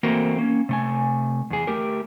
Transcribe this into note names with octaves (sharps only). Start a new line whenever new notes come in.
E3 A3 A#3 C4 F#4 A#4
A#3 C#4
C3 A3 G#5
E2 G#4
A3 G4 A#4